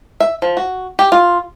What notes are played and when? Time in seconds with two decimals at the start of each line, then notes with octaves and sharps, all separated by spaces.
0.20 E5
0.42 F3
0.57 F#4
0.99 G4
1.12 F4